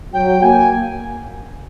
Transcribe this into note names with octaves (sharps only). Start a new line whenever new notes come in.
F#3 G5
A#3 G#5